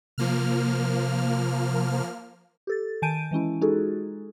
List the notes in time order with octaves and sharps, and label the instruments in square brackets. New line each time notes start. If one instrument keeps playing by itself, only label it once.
[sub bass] C3 [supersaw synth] F3 A#3 F6
[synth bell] G4 A4 A6
D#3 G#5 A5 G6 D7 D#7
E3 G#3 C#4 E4
G#3 D#4 F4 F#4 G#4 A4